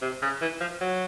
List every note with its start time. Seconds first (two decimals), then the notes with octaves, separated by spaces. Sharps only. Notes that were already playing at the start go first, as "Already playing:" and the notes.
0.02 C3
0.22 C#3
0.41 E3
0.61 F3
0.81 F#3